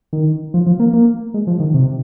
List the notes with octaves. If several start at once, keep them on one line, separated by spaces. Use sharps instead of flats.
D#3
F3
F3
A#3
A#3
G#3
F3
D#3
C3